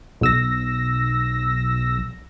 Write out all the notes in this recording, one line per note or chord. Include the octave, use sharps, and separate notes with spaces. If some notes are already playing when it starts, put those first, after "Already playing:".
B1 E6 A#6